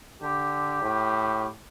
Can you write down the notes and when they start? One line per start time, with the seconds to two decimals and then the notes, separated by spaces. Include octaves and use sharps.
0.22 D3 G4
0.82 A2